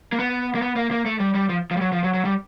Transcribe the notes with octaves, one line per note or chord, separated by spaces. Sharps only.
A#3
B3
A#3
B3
A#3
A#3
A3
G3
G3
F3
F3
G3
F#3
F3
F#3
F#3
G3